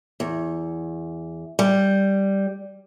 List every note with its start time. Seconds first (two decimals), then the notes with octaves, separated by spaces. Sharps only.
0.20 E2
1.59 G3